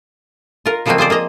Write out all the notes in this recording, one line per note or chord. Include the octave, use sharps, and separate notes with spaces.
F4 A#4
C#3 F3 F#3 G#3 A#3 C4
F4 G#4 C5 D5
A#3 G#4 D#5 A#5